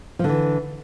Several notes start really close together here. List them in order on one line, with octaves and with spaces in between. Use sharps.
F3 D3 E3